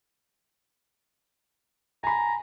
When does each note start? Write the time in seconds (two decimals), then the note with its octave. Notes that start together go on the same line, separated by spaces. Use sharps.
2.04 G#5 A#5 B5